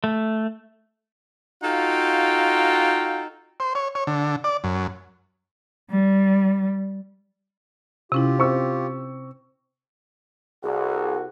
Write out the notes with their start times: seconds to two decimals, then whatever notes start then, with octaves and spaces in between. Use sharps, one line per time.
0.04 A3
1.63 D#4 F4 F#4 A4 F5 G5
3.60 C5
3.75 C#5
3.95 C#5
4.07 D3
4.44 D5
4.64 F#2
5.91 G3
8.12 C3 C#4 E4 F4 G4
8.39 C4 C#6 E6
10.63 C2 F#4 G#4